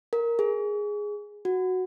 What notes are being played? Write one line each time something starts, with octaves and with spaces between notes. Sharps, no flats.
A#4
G#4
F#4